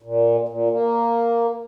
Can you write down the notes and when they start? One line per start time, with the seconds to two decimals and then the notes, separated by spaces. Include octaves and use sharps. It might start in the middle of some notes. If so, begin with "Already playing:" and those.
0.02 A#2
0.48 A#2
0.70 A#3